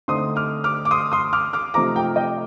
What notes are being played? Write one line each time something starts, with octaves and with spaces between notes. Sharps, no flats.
D3 A3 C4 D#4 C6 D#6
D6 F6
D6 F6
D6
C6 D#6
C6 D#6
D6 F6
D6 F6
C3 F3 A3 C4 D#4 A#5 D6
G5 A#5
D#5 G5